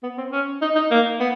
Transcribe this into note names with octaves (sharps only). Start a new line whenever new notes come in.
B3
C4
C#4
D#4
D#4
A#3
B3